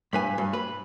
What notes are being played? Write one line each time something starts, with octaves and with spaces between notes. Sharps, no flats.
G2 B4 G#5
G2
B4